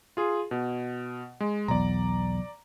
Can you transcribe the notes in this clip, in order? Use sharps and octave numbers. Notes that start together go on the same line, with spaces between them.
F4 G#4
B2
G#3
B1 E2 D5 A#5